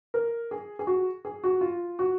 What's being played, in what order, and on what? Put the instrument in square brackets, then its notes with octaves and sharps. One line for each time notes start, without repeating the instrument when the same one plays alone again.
[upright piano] A#4
G#4
G#4
F#4
G#4
F#4
F4
F#4